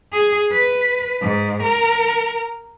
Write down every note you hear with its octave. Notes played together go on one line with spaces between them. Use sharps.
G#4
B4
G#2
A#4